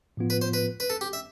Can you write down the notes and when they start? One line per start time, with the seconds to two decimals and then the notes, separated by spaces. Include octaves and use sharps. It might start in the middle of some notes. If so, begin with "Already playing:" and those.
0.17 A2 F3 B3 F4
0.30 B4
0.42 C5
0.53 B4
0.80 B4
0.90 A4
1.01 G4
1.13 E5